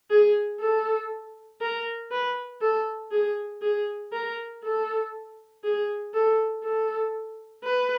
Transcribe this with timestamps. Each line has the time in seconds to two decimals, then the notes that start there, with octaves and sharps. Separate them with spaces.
0.10 G#4
0.60 A4
1.61 A#4
2.11 B4
2.61 A4
3.11 G#4
3.61 G#4
4.12 A#4
4.63 A4
5.64 G#4
6.14 A4
6.64 A4
7.64 B4